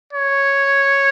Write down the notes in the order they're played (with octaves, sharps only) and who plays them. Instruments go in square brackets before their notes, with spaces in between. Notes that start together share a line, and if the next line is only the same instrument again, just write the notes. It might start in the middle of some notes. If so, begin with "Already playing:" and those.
[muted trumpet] C#5